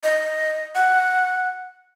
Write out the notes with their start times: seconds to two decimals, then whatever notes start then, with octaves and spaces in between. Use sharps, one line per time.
0.03 D#5
0.75 F#5